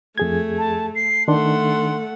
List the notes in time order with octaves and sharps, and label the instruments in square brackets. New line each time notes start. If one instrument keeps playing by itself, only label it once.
[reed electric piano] F2 G#4 G#6 [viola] A3
[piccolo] A5
C7
[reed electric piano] D#3 D4 [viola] A3 F#5 [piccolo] C6